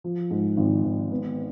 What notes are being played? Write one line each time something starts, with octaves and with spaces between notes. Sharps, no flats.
F3
G#2
G#1
G#1
B3